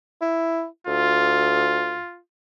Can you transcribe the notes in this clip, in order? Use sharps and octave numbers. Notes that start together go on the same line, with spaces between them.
E4
D2 F4